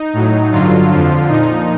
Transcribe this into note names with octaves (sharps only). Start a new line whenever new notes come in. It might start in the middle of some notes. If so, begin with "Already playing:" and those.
Already playing: D#4
A2 F#3
G2 D3 F#3 F4
F2 D3 F3
A#2 F3 D#4